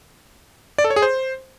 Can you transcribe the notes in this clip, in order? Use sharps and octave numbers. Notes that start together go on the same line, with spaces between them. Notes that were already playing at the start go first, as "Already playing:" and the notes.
D5
A4
C#5
G#4
C5